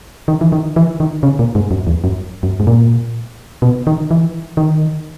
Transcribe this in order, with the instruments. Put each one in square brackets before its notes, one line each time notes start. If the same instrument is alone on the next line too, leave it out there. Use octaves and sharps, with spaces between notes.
[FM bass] D#3
E3
D#3
E3
D#3
C#3
A#2
G#2
F#2
E2
F#2
F#2
G#2
A#2
B2
D#3
E3
D#3